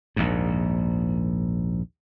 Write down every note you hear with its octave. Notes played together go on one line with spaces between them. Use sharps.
A#1 D#2 G#2